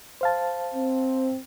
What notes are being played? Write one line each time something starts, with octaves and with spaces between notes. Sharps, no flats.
C5 F5 A5
C4